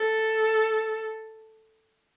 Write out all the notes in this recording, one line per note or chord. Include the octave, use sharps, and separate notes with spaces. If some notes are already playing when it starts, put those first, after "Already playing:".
Already playing: A4